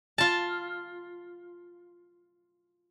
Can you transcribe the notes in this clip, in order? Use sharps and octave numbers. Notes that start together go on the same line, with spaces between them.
F4 A5